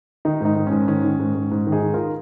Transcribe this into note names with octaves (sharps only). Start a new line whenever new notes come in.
D#3 D#4
G#2 D#4
D#3
C#4
G#2
D#3 C#4
D#3
G#2
G#2
G#2
D#3
D#4 G#4
D#3
F4 A#4